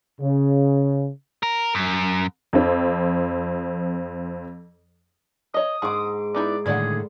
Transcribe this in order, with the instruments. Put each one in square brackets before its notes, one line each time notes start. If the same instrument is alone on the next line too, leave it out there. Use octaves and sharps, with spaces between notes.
[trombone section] C#3
[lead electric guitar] A#4
F#2
[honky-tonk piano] F2 F3 C4
[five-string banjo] C#5 D#5 [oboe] D#6
[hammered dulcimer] G#2 D6 [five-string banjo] G#4 F#5
[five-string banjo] B3 D#4 E4 [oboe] D5
[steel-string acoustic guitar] A2 D3 D#3 [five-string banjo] G3 D5 F#5 [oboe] G#4